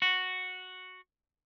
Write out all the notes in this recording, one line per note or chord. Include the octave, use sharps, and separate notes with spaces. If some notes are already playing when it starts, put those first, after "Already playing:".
F#4